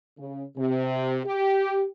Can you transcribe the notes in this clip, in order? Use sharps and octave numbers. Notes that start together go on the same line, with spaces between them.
C#3
C3
G4